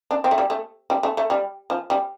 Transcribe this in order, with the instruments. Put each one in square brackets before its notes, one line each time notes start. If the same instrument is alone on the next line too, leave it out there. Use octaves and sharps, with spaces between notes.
[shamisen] D4
C4
A3
G3
A3
G3
A3
A3
G3
F3
G3